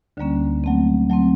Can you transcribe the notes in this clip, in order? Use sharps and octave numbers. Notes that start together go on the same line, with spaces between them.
D2 D3 G3 A#3 C#4
F#3 A3 C4
F#3 A3 C4